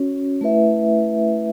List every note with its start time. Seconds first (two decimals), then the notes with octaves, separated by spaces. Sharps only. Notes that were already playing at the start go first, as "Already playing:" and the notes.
Already playing: C#4 F#4 C#5
0.41 A3 E4 B4 E5